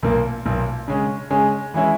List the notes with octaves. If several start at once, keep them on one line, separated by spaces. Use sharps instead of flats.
B1 A#2 A#3
B1 A#2 A#3
C#3 G#3 C#4
C#3 G#3 C#4
E3 G#3 C#4 E4